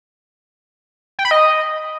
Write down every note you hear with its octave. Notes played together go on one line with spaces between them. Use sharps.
G5
B5
D#5